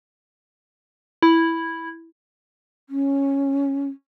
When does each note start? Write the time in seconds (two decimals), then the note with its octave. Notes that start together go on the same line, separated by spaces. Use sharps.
1.22 E4
2.89 C#4